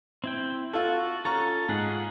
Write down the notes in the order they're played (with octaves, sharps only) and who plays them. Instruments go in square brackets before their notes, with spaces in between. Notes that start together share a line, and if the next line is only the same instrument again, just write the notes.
[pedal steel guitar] C4 E4 G5
[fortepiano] F4 A4 [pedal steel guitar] F#4
[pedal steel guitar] C#4 F4 A4 [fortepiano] A#5 C#6
[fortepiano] G#2 [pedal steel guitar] F4 G#4 F#5